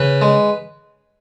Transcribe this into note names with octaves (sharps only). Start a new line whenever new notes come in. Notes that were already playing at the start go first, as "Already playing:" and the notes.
Already playing: C#3 B4
G#3